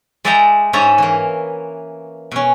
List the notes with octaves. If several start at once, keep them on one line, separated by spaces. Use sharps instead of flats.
G#3 D5 E5 G5 A5 A#5
G#2 C#4 C#5 E5 A5 A#5
E3 A#3
B2 C#4